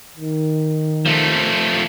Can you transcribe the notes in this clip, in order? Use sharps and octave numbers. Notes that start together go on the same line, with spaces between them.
D#3
F3 A3